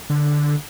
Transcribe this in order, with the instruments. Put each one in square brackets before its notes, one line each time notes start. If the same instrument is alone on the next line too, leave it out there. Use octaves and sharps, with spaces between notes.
[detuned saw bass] D3